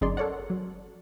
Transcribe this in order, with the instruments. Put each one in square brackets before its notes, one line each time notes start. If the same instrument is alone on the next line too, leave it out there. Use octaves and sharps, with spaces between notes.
[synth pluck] G1 F#2 D#4 G#4 D5 C6
A4 A#4 C#5 D5 F#5
F#3